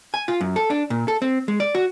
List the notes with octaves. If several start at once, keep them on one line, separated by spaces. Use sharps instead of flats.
G#5
F4
F#2
A4
D4
A#2
A4
C4
G#3
D5
F#4